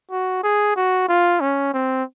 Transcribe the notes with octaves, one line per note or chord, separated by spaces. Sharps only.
F#4
G#4
F#4
F4
C#4
C4